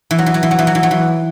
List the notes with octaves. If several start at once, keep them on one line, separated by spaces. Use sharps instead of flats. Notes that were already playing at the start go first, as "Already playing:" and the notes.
E3
F#3
E3
F#3
E3
F#3
E3
F#3
E3
F#3
E3